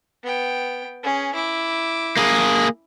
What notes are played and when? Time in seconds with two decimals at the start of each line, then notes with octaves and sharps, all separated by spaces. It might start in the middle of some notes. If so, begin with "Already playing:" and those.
0.24 B3 G5
1.03 C#4 G#4
1.35 E4 D6
2.17 A#3 G#4